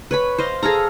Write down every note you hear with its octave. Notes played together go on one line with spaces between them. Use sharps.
B4 C#5 B5
C5 D#5 F5
G#4 A4 F5 A#5